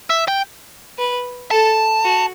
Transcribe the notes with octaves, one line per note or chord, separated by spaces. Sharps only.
E5
G5
B4
A4 A5
F#4